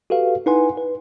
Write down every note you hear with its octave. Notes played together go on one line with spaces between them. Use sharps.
F#4 G4 A4 B4 F5
D#4 E4 B4 F#5 G#5 C6
B4